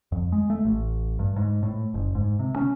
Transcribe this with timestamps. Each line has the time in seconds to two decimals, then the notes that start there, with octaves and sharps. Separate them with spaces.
0.12 F2
0.32 G#3
0.50 A3
0.65 A1
1.19 G2
1.36 G#2
1.63 A2
1.94 F#1
2.15 G#2
2.39 C3
2.56 C#4